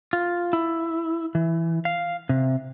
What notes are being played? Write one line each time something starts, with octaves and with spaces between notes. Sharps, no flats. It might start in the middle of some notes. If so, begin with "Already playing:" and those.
F4
E4
E3
F5
C3